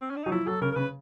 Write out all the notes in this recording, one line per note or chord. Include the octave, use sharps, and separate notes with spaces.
C4
C#4
D4
F#3 D#4
F3 E4
F#3 A4
C#3 A#4
A#4
C#3 B4